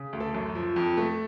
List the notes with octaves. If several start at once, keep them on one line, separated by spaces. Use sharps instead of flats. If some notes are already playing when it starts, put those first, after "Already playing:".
Already playing: C#3
D2
A4
F#2
F3
F2
A3